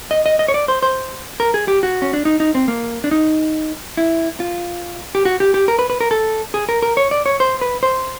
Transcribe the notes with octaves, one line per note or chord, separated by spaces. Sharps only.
D#5
D#5
D#5
C#5
D5
C5
C5
A#4
G#4
G4
F#4
C#4
D4
D#4
D#4
C4
A#3
D4
D#4
E4
F4
G4
F#4
G4
G4
A#4
B4
B4
A#4
A4
G#4
A#4
A#4
C#5
D5
C#5
C5
B4
C5